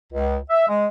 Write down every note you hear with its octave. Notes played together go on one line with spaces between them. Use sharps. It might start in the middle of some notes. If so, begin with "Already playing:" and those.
C#2
E5
G#3